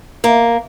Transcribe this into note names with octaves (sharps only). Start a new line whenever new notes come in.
A#3